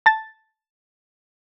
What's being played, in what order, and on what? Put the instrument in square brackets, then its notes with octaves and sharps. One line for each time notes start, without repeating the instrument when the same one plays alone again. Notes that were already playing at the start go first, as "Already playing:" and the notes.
[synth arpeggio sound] A5 A6